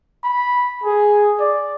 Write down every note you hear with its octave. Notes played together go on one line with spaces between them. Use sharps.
B5
G#4
D5